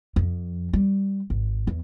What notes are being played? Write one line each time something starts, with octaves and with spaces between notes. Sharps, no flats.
F2
G3
G#1
E2